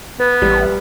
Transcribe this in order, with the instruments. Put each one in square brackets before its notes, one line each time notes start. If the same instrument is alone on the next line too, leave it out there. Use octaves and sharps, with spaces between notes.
[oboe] B3 [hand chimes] B4
[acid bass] A1 [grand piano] G3